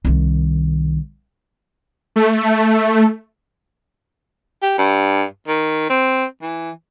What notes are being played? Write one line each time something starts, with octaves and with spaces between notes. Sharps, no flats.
C2 D#3
A3
G4
G2
D#3
C4
E3